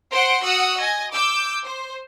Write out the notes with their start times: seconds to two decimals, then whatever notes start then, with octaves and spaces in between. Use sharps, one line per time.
0.13 C5 F#5 C6 D7
0.44 F#4 F#5 D#6 E6 F#6
0.79 D#5 G#5 A#6
1.13 D6 E6 G6
1.64 C5